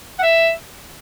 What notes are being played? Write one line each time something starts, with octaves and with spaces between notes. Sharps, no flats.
F#5
E5